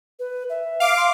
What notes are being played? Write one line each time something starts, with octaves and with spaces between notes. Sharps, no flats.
B4
E5
F5 D6
C6